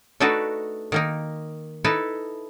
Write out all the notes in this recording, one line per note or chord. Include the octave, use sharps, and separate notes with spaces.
A3 D4 D#4 F#4 A4 B4
D#3 A#3 D#4
D#4 E4 A4 B4